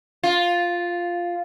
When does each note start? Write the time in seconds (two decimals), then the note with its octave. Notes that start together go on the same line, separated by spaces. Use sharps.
0.23 F4